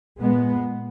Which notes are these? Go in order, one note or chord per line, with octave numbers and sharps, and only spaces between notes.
A#2 G#3 B3